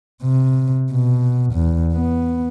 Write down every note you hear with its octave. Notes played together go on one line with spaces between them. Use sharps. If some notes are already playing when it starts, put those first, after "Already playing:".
C3
B2
E2
B3